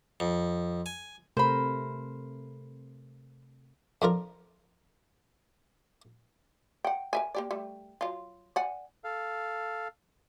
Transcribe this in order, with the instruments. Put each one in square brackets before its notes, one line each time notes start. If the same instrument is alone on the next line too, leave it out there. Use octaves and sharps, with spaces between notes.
[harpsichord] F2
G#5
[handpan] C3 A3 A#4 [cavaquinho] C5 B5
[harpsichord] F2 D4 F4 A#4 A#5
[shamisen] F#5 G5
A#4 E5 G#5
A#3 G4 D5
G3 A3
F#3 F4
D5 F#5 G#5
[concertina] A4 F5